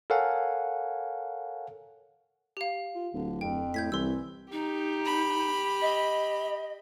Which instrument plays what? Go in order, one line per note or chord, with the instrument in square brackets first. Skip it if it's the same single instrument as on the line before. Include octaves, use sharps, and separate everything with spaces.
[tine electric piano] A4 A#4 C#5 F5 F#5 G#5
[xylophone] G4 F5
[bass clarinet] F4
[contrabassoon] D1 [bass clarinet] D3
[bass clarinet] F2 [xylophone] G5
[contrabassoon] A2 [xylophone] G6 G#6 B6
[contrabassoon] C2 [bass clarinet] E3 [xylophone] C6 E6
[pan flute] D#4 [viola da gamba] G4
[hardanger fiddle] B5
[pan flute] D#5